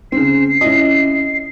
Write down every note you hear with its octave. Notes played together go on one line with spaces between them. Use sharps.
C#3 C4 C7
C#4 E4 D#5